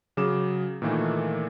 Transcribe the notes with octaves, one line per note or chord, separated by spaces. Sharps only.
C#3 F#3 G#4 D6 E7
A#2 D#3 E3 A3 A#3 D#4